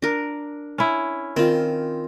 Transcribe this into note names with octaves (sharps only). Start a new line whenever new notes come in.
D4 A#4
C#4 E4
D#3 C4 F4